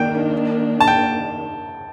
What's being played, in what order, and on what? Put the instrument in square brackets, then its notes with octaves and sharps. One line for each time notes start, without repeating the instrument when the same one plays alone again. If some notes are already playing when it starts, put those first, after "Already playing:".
Already playing: [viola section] D#3 A#3 D4 [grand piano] G5
[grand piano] A5
G5